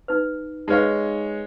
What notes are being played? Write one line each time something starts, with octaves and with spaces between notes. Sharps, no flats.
D#4 B4
G#3 D#4 B4 C#5 F5